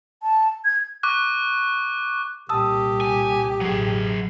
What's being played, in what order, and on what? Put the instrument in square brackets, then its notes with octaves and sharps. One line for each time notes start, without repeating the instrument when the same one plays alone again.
[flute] A5
G#6
[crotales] C#6 D6 F#6
[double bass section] C2 A#2 [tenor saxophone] G4 [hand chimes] A5 D#6 E6
[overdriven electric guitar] G#5
[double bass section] A1 B2 [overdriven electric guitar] F#3 G#4